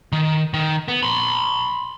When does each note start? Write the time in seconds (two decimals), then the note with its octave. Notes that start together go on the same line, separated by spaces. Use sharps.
0.12 D#3
0.54 D#3
0.88 B3
1.03 B5 C6